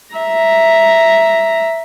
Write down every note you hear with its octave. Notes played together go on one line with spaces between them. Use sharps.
E5 A#5